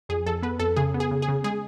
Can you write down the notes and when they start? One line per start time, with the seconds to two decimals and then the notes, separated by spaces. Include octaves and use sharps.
0.09 F2 G#4
0.26 F2 A4
0.43 B3 B4
0.59 F2 A4
0.76 C#3 G#4
0.94 B3
1.00 G#4
1.11 C#3
1.22 G#4
1.28 C#3
1.44 G#3 G#4